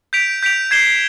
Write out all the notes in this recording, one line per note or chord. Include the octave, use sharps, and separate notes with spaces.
G6 B6 D7 F7
G6 B6 D7 F7
G#6 C7 E7 G7